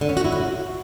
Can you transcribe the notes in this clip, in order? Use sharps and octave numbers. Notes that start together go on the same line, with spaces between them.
D3
C#4
F#4
E4
F#4